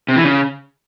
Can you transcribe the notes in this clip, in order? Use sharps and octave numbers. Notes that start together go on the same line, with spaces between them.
C3
E3
C#3